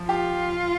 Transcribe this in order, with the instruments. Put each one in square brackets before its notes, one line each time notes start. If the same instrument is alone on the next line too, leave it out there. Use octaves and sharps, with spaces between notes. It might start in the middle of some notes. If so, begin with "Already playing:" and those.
Already playing: [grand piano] F3
[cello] F4 [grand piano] G4